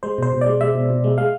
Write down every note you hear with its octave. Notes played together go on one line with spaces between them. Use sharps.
G#3 C5
B2 C5
B2
G#3 D5
G#3 E5
B2
B2
G#3
G#3 F5